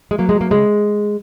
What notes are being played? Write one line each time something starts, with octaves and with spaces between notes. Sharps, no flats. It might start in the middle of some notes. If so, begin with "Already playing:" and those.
G#3
F#3 A#3
G#3
F#3
A#3
C#3 G#3